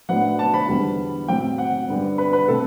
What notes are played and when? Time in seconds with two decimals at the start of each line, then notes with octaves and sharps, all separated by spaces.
0.09 A2 F#3 B3 D4 F#5
0.39 A5
0.54 B5
0.68 E2 D3 G3 B3
1.28 A2 F#3 C4 G5
1.58 F#5
1.88 G2 D3 G3 B3 D4
2.18 B4
2.33 B4
2.48 B2 A3 C4 A4